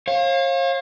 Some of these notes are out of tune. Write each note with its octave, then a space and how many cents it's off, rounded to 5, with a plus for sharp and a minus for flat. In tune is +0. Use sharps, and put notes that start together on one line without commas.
C#5 -45 F5 +0